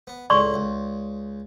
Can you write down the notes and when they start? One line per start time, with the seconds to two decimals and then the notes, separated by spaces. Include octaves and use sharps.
0.07 B3
0.30 C#2 A2 D5 C6 C#6
0.54 C#2